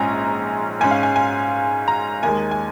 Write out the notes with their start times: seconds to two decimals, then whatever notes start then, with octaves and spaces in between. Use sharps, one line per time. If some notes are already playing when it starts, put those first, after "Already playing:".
Already playing: A#1 G#2 G#3 C#4 G#5 A#5
0.80 G#2 G#3 C#4 G#5
0.91 F5
1.03 G#5
1.16 G#5
1.88 A#5
2.23 D#2 D#3 G#3 G#5
2.51 G#5